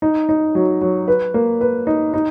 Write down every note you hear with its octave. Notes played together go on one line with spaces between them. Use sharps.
D#4
D#4
F#3
F#3
B4
A#3
B4
D#4
D#4